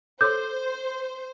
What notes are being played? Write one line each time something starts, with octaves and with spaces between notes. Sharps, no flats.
A4 C5 C#5 C6 D6 G6